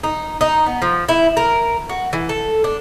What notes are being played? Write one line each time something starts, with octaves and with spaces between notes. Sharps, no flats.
D#4
D#4
B3
F3
E4
A#4
F#4
E3
A4
D4